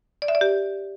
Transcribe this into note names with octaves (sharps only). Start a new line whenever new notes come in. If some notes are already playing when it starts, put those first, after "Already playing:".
D5
E5
D5
G4